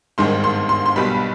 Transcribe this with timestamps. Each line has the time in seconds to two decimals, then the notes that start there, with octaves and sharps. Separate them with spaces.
0.18 G#1 G2 D#3 G#3 C6
0.44 C6
0.69 C6
0.86 C6
0.96 B1 B2 G3 B5